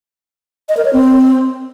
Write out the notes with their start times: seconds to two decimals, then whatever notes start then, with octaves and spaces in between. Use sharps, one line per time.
0.69 D#5
0.77 A#4
0.85 C#5
0.93 C4